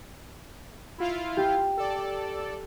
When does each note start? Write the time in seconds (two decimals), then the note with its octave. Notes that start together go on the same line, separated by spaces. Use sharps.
0.98 E4 F4 F5
1.37 G4
1.77 A4 D5